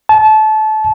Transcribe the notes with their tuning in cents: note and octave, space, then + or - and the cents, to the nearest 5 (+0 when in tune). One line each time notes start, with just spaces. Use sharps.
A5 -25